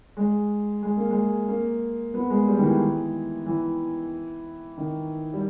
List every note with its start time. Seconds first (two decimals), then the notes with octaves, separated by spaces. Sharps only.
0.17 G#3
0.83 G#3
0.97 A#3
1.10 G#3
1.48 A#3
2.14 B3
2.30 G#3
2.48 G3
2.59 D#3
2.64 E3
3.46 E3
4.78 D#3
5.33 G3